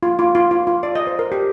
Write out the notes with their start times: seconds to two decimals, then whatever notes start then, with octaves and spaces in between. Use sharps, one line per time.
0.03 F4
0.19 F4
0.35 F4
0.51 F4
0.67 F4
0.83 D5
0.95 D#5
1.07 C5
1.19 A#4
1.32 G4